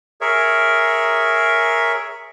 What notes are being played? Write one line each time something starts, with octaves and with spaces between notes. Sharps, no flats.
G#4 A#4 C#5 E5